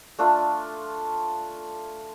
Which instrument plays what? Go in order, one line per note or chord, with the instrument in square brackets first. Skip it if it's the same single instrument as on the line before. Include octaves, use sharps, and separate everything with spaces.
[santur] A3 D4 F4 A4